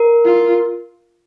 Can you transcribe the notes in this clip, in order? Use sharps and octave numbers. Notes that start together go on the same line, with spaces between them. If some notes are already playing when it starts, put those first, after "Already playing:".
Already playing: A#4
F4